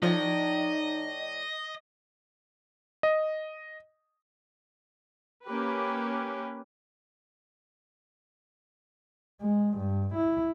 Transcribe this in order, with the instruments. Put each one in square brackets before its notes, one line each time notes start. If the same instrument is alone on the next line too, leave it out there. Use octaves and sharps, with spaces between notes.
[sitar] A2 D5 [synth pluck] F3 [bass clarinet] D#4 [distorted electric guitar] D#5
[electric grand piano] D#5
[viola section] A#3 C#4 G4 B4
[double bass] G#3
G2
E4